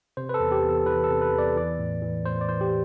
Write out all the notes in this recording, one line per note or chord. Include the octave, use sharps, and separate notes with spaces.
C3 C5
B4
A4
E2
G4
E2
A4
E3 B4
A4
C3
B4
E2
D5
E3 D5
A2
E3
A2 C5
D5
E3 C5
G4